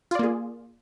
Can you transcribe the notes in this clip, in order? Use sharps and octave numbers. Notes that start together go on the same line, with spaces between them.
A#3 F4 G#4 D5